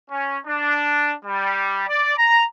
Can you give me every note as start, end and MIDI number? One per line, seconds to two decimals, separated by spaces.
0.11 0.38 61
0.46 1.12 62
1.25 1.84 55
1.88 2.16 74
2.17 2.43 82